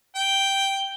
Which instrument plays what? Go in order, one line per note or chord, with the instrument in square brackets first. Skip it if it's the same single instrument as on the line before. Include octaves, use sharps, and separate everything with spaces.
[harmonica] G5